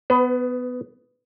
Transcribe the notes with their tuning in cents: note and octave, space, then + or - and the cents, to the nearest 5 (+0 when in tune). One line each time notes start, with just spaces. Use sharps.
B3 +15 B4 +45